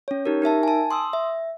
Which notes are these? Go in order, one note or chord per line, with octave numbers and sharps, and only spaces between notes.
C#4 C#5
D#4 G4 A#4
D#4 A#4 E5 A5
G#5 A5
C6 D#6 E6
E5